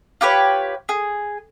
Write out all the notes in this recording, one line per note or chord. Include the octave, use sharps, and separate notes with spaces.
F4 G4 B4 C#5
G#4